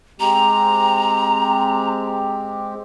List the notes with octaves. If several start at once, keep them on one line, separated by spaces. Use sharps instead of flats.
G#3 C4 G4 A#5